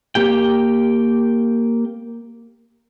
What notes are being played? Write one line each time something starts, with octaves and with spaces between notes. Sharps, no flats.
A#3 G4 G5